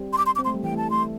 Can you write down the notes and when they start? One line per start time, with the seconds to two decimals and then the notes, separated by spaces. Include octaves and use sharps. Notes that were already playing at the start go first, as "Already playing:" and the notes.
Already playing: G3 C4
0.13 C6
0.18 D6
0.26 C6
0.36 D6
0.39 C4
0.45 A3 C6
0.54 G3
0.63 E3 G5
0.72 A3
0.77 A5
0.90 A3 C6